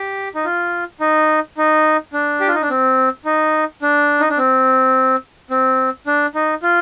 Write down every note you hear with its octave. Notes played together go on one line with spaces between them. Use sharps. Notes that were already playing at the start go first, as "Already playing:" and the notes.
Already playing: G4
D#4
F4
D#4
D#4
D4
G4
F4
D#4
D4
C4
D#4
D4
D#4
D4
C4
C4
D4
D#4
F4